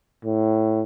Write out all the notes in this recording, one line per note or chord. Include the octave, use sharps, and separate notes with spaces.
A2